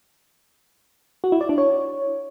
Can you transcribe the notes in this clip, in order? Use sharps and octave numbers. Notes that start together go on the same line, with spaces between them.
F#4
E4
D5
D4
C#5